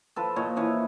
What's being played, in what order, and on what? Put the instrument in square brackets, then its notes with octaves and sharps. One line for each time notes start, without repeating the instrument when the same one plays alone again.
[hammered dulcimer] F3 A4 B4
A#2 C#5 D#5
E3 B4 C#5